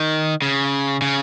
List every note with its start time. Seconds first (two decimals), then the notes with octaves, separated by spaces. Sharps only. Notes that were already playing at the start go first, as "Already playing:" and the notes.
Already playing: D#3
0.42 C#3
1.02 C#3